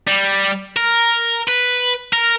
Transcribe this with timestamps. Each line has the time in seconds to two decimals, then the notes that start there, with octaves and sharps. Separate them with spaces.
0.07 G3
0.76 A#4
1.48 B4
2.13 A#4